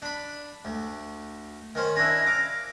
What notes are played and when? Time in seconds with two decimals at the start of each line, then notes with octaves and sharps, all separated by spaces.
0.02 D4 B5
0.65 D2
1.75 D#3 C#4 C5
1.96 C#4 D4 E4 A#6
2.27 F5 D6